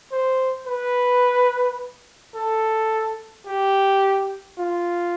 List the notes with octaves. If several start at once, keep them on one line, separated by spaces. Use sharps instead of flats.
C5
B4
A4
G4
F4